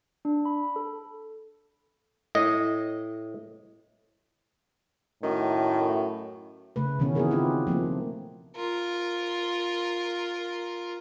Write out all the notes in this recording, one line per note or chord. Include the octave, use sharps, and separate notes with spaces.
D4
B5
A4
A2 D#5
F#2 A2 D#3
C#3 A3 B4
B2 D#3 E3 B3 C#4
B3 C4 E4 G#4 A#4
B3 C4 D#4 F4 G4
F3 A3 A#3 C4
F4 A#4